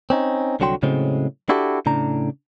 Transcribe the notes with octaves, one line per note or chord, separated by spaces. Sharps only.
C4 C#4 D#4
C2 D3 F#3 F#4 G5 C6
A2 C#3 F#3 G#3 C4
D4 E4 F#4 G4 A4
A2 C#3 D4 A#5